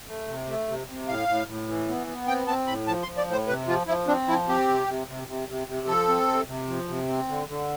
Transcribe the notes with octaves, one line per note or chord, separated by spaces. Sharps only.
A3
C3
A3
C3
C3
A2 F5
A2
A2
E3
B3
B3
C4 G5
C4 A5
A2 B5
F3 A5
C6
F3
D5
A2 C5
C3 B4
F3 F4
F3 E4
C4 D4
F3 E4
C4 G4
C3
C3
C3
C3
C3
C3
F3 A4
C4
C3
C3
F3
C3
C4
D3
D3